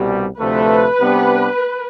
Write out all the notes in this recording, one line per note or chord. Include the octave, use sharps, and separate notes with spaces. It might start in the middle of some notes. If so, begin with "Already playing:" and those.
Already playing: C2 B2 G3
D2 C3 F3 A3 B4
C3 G3 B3 D4 G4